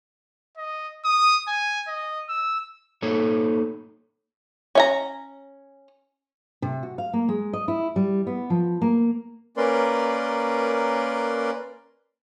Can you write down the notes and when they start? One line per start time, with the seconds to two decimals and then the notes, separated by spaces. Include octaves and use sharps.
0.57 D#5
1.05 D#6
1.47 G#5
1.87 D#5
2.29 E6
3.02 A#3 D#4 A4 C#5
4.75 C#4 E5 A#5
6.62 C3
6.83 F#4
6.98 F5
7.13 A#3
7.29 G#3
7.53 D#5
7.68 E4
7.96 G3
8.27 B3
8.50 F3
8.82 A#3
9.57 A#3 C#4 A#4 B4 D5 C6